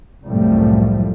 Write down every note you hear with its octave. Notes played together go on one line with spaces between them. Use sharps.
C2 F#2 A2 F3 G3 A3